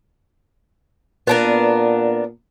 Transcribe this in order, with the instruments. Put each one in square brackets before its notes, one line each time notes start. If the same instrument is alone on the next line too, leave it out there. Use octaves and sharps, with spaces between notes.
[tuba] A#2 [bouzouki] B3 D4 A#4